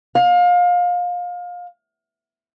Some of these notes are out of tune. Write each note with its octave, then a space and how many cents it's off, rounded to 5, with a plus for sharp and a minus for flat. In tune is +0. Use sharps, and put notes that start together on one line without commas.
F5 +25